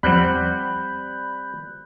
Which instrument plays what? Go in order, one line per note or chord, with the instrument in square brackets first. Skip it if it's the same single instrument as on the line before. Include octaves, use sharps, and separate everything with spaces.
[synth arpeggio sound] E2 F3 [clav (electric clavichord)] G3 C4 F#5 [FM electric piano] B5 F#6 G6